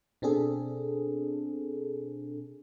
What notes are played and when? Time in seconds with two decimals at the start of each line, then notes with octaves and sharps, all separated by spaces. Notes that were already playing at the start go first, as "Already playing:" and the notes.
0.22 B2 C4 D4 G#4 A4